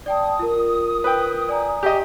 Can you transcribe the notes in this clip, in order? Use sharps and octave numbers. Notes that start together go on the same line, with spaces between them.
D5 G5 A5 D#6
F4 A#4
B4 G5
D5 G#5 A#5
G4 D#5